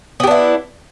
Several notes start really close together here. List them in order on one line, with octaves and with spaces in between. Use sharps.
B3 G4 D4 E4